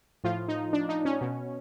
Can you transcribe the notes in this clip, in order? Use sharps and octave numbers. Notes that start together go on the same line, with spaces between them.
A2 F3 F4
D#4
D4
D#4
C#4
B2